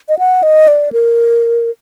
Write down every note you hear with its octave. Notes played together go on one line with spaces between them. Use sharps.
D#5
F#5
D#5
D5
A#4